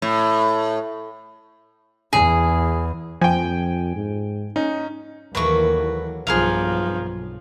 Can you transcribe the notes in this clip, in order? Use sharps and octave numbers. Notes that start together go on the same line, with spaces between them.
A2
E2 G#4
F2 F3 G5 G#5
G#2
C#4 D#4
D#2 E3 F#3 A3 A#3 B4 C#6
B1 G2 F3 G#4 A#4 F5